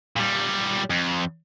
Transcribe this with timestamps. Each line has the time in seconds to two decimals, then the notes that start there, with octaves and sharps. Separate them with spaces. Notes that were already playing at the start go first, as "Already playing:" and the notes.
0.16 A#2 G3
0.90 F2